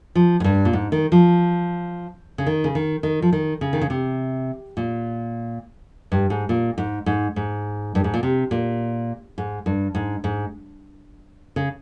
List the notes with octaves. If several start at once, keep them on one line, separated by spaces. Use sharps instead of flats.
F3
G#2
G2
A#2
G#2
D#3
F3
C#3
D#3
C#3
D#3
D#3
F3
D#3
C#3
D#3
C#3
C3
A#2
G2
G#2
A#2
G#2
G#2
G#2
G2
G#2
A#2
C3
A#2
G#2
G2
G#2
G#2
C#3